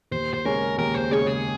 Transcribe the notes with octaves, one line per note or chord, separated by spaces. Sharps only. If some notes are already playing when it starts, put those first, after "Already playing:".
D#2 C5
C5
C#3 G#3 C#4 A#4
D#2 A#4
C5
C#3 G#3 C#4 C#5
G#4